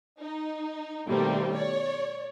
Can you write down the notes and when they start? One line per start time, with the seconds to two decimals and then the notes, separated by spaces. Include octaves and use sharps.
0.20 D#4
1.08 B2 D#3 G3 A3 A#3 C4
1.53 C#5 D5